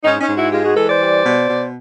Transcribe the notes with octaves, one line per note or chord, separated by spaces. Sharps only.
G#2 C#4 D#4
C#4 D#4
G#2
E4 F#4
G#3 F4 G4
F#4 G#4
E3 A4 B4
C5 D5
G3
B2
B2